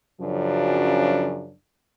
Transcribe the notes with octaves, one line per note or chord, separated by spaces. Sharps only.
F#2 C#3 F3 F#3 D4